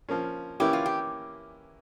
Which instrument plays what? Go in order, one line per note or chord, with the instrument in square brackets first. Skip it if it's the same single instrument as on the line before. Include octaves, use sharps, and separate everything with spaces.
[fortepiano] F3 A#3 C#4
[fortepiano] E3 A#3 C#4 E4 [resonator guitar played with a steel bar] G4
[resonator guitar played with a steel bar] F4
G4